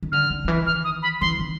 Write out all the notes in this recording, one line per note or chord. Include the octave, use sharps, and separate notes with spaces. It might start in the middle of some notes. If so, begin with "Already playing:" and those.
D#3
D3 F6
D#3
D#3
E3
D#3 F6
D#6
B5
E3 C6
D#3